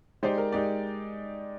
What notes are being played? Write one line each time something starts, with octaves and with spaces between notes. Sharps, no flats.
G#3 D#4 G4 C5 D5
A#4
G#3 D#4 G4 D5